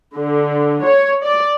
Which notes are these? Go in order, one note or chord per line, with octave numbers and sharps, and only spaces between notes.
D3
C#5
D5